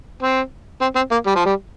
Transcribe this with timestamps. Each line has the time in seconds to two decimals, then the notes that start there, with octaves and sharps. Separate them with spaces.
0.22 C4
0.81 C4
0.96 C4
1.11 A#3
1.26 G3
1.36 F3
1.46 G3